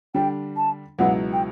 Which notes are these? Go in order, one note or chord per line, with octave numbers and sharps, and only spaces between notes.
D3 G3 D4 G5
A5
C#2 B2 F#3 B3 E4 F#5
G5